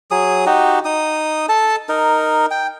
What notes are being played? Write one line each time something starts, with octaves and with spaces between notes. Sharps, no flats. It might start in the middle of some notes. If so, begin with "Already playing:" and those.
F#3 G#4 D#6
D#4 F#4 G4
D#4 D#6
A4 A5
D#4 A#4
G5